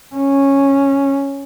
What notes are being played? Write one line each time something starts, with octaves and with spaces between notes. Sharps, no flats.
C#4